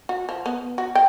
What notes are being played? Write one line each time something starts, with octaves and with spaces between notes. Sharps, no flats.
F#4
F3
B3
F#4
G5